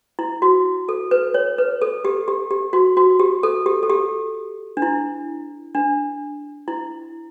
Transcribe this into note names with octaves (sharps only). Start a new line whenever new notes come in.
E4
F#4
A4
B4
C#5
B4
A4
G4
G4
G4
F#4
F#4
G4
A4
G4
A4
G4
D4
E4
D4
E4